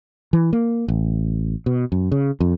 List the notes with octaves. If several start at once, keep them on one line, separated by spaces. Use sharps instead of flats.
E3
A#3
A1
B2
F#2
C#3
F2